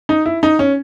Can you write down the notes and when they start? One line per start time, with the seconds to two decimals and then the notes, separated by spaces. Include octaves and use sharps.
0.09 D#4
0.26 E4
0.43 D#4
0.59 C#4